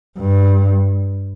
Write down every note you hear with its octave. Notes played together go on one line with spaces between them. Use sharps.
G2